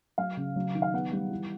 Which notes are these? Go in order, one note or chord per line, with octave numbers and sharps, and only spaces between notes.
F#3 F5
C#3
F#3
D#3
F5
B3 F#5
G3
E3